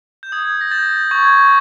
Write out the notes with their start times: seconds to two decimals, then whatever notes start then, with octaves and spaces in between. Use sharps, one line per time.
0.23 G6
0.32 D#6 G#6
0.61 A#6
0.71 G6 A6
1.11 C#6 G#6